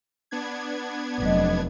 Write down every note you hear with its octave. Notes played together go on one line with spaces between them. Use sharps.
B3 D4 G#6
F1 F#3 D#5